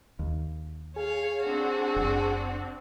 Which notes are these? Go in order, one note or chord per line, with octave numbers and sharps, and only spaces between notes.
D#2
G#4 C#5 F5
C4 D4 F#4
F#1